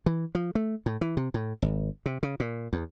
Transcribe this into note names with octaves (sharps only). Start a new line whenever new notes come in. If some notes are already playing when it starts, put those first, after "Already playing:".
E3
F3
A3
A2
E3
C3
A2
G#1
C3
C#3
A#2
E2